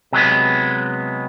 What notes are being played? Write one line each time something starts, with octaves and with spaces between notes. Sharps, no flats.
C3 F#3 G#3 B3